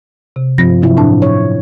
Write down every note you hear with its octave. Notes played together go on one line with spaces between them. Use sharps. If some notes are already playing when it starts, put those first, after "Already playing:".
C3
G2 F3 C4 A#6
C3 F#3 E4
A2 D4 A5
C#5